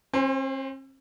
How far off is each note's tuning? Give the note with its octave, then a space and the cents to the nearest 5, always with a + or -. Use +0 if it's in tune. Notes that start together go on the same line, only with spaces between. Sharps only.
C4 +45 C5 +0 G#5 -15